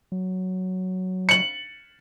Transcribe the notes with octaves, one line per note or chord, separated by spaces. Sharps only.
F#3
C#7 F#7